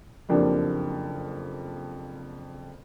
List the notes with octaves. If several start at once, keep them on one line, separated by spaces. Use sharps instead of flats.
F#1 F2 A#3 D4 G4